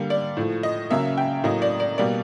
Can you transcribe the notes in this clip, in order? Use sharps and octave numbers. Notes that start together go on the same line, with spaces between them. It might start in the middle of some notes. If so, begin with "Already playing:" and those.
Already playing: D3 G3 A#3
D5
A2 F3 A3
D#5
C#3 F#3 A#3 E5
G5
A2 F#3 A#3 D#5
D5
D5
B2 G3 A#3 D5